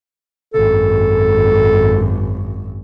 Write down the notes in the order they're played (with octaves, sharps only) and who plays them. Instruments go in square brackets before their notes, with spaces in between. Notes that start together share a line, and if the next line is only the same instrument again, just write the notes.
[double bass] G#1 F#2 [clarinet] A4